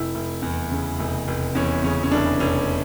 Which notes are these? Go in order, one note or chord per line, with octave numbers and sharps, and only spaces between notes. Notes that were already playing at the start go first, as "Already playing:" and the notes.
Already playing: F1 E4
F1
E2
C#3
F1
F1
E2 C#4
C#3 C#4
C#4
F1 D4
F1 C#4